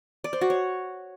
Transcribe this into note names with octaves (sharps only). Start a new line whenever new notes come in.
D5
C5
F#4
C#5